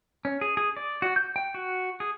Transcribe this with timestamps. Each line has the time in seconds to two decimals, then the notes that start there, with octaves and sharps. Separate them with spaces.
0.25 C#4
0.41 G#4
0.57 G#4
0.77 D5
1.02 F#4
1.16 G6
1.36 G5
1.54 F#4
2.00 G#4